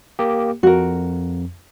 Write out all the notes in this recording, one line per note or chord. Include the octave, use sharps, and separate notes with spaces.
A#3 G4
F2 F#4 A#4